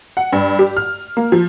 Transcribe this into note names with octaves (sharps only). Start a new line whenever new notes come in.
F#5
G2
G4
F6
A#3
F3